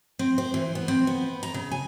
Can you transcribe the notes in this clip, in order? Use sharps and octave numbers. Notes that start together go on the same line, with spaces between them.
C4
C5
E3
B3
C4
B3
A#5
C#3
G#5